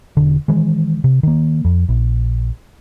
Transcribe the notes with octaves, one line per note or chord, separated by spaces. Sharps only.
E1 D3
D#3 E3 G#3
C3
D#3 A#3
F2
A#1